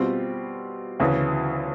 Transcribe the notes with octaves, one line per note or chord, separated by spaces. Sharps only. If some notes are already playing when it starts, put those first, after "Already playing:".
Already playing: B2 G3 C4 F4
D2 C#3 E3